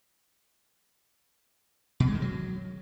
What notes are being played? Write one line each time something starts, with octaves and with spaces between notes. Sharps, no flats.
B2
G#3
D#3
F#3